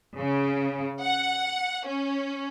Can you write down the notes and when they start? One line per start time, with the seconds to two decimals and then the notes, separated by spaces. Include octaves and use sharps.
0.18 C#3
1.01 F#5
1.86 C#4